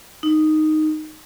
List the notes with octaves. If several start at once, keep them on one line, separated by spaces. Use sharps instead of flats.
D#4